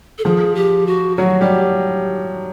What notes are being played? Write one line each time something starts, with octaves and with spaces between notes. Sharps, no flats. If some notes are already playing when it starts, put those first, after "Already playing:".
A4
F3 G#4
G4
F#4
F#3 F#4
G3 G4